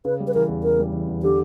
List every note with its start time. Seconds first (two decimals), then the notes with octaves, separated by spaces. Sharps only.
0.05 C#3 B4
0.20 G3
0.27 B4
0.34 E3 A#4
0.49 E2
0.63 C#3 A#4
0.79 G3
0.93 E3
1.08 E2
1.22 D3 G4